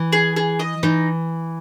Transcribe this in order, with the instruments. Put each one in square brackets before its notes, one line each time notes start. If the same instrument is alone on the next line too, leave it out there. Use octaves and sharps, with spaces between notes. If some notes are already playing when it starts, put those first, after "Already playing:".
Already playing: [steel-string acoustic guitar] E3
[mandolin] G#4
G#4
D#5
[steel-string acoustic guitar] E3 [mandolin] D#4